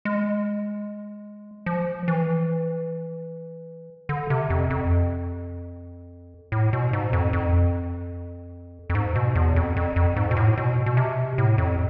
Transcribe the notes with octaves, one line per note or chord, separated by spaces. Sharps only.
G#3
F3
E3
D3
C3
F2
F2
A2
B2
G#2
F2
F2
F2
G#2
B2
E2
F2
F2
F2
G#2
B2
A2
B2
B2
C3
A2
F2